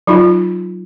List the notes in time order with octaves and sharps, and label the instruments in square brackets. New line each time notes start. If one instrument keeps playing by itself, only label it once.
[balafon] F#3 D#4 F4